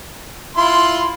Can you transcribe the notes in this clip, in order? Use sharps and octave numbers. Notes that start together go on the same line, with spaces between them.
E4 F4 C6